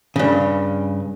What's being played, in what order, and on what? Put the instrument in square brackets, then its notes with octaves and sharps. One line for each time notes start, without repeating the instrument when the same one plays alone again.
[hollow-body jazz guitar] G2 C#3